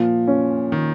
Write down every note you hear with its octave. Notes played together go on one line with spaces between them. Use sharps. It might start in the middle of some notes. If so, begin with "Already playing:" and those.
Already playing: A#2 F3
C#4
D#3